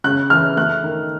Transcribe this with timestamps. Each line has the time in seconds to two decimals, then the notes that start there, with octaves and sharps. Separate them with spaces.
0.04 C#3 F#6
0.30 E3 F6
0.56 A3 F#6
0.84 D#3